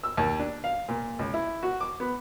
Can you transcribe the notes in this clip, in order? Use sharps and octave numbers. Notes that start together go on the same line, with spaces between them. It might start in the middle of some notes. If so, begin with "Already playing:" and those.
E6
D#2
D4
F5
A#2
C#2
E4
F#4
D6
B3